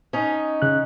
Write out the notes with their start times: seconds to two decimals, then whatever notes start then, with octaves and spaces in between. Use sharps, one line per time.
0.13 C#4 D#4
0.62 C#3 F#6